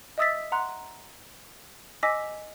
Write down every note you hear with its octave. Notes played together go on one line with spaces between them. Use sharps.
D#5 E5 D#6 E6 A6 B6
F#5 A#5 C6 F#6
D#5 G#5 D6 E6 A#6 B6